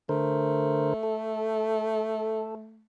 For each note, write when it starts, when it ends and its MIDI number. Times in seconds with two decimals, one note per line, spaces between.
0.09 0.94 50
0.09 2.85 57
0.09 0.94 70
0.09 0.94 72
1.03 2.55 69